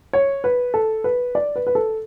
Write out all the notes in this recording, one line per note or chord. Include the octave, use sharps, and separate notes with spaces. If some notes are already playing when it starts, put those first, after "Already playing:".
C#5
B4
A4
B4
D5
B4
B4
A4